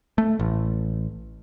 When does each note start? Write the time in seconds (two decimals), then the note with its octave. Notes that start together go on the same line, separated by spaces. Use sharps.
0.18 A3
0.40 A1